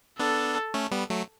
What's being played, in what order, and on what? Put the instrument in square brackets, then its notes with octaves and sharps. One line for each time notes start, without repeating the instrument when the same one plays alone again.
[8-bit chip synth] B3 D4 [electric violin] A4
[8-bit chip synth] A3 C#4
G3 B3
F#3 A3